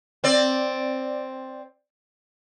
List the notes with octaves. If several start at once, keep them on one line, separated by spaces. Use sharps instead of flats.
C4 D5